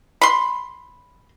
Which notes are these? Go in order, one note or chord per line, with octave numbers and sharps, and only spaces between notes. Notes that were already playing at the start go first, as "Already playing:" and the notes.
B5 C6